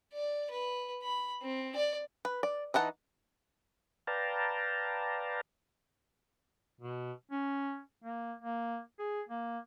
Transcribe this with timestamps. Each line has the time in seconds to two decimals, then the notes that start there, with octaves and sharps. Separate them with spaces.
0.13 D5
0.50 B4
1.03 B5
1.42 C4
1.76 D5
2.25 B4
2.43 D5
2.74 E3 D#4 F#5 A5
4.07 B4 D5 F5 G5 A5 A#5
6.81 B2
7.31 C#4
8.04 A#3
8.40 A#3
8.99 G#4
9.29 A#3